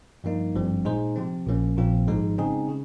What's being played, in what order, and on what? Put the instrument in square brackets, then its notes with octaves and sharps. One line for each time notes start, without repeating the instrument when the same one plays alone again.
[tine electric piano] G2 F3 A#3 D#4
G#1 G2 F3 C4
A#2 G#3 D#4 G#4 C5
C3 F3 C4
A#1 A#2 F3 A#3 C#4
A#1 A#2 F3 C4 F4
G#1 G#2 F3 G#3 D#4
C#3 G#3 C4 D#4 G#4
C#3